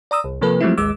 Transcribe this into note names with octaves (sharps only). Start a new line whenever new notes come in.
D5 A#5 D#6 E6
C2
C3 F3 A#3 A4 B4
F3 F#3 G#3 A3 C4 E4
A1 D#2 G#3 D6 E6